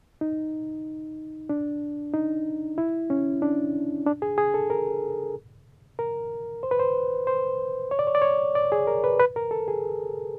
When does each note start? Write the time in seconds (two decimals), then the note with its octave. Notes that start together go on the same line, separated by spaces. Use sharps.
0.21 D#4
1.49 D4
2.13 D#4
2.78 E4
3.10 C#4
3.42 D4
4.06 D4
4.22 G#4
4.38 G#4
4.54 A4
4.70 A#4
5.99 A#4
6.63 C5
6.71 B4
6.80 C5
7.27 C5
7.91 C#5
7.99 D5
8.07 C#5
8.15 D5
8.22 C#5
8.55 D5
8.72 G#4
8.87 A#4
9.04 B4
9.19 B4
9.36 A#4
9.51 A4
9.68 G#4